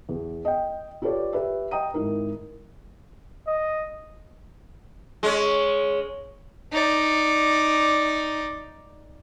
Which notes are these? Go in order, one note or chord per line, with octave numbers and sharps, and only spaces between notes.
E2
D#5 G5
F4 G4 A4 B4 C#5 D5
G4 B4 E5
D#5 G5 A#5 D#6 D#7
G#1 D#4 E4 A#4
D#5
G#3 C#4
D#4 D5